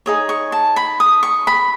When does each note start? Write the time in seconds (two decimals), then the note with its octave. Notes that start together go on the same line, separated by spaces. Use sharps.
0.06 D#4 G#4 C#5
0.29 C#6
0.52 A5
0.76 B5
1.00 D#6
1.23 C#6
1.47 B5